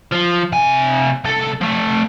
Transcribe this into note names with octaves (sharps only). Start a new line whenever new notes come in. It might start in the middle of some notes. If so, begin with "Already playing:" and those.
F3
C3 G#5
C2 A4
F3 A3